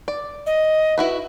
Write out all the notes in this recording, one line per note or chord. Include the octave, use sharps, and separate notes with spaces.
D5
D#5
E4 F#4 B4